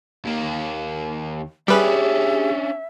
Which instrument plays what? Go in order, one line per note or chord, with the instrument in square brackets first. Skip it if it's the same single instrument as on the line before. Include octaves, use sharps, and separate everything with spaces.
[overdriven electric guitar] D#2 A#3
[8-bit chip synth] G3 B4 [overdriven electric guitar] C#4 D4 [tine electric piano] G4 G#4 [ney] E5